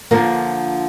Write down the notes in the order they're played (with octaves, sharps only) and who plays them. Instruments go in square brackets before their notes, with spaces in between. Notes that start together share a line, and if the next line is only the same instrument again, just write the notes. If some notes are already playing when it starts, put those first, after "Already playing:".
[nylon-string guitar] D3 F3 A#3 F4 A#4